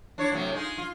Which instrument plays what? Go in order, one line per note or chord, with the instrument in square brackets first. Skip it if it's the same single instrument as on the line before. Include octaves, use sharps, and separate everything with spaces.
[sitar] D4 E4 C#5
A2 C3 F#3
G#3 D#4 F4
F4